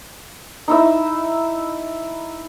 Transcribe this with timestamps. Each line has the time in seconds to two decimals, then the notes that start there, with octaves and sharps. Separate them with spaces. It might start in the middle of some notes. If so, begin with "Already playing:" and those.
0.68 D#4 E4 E5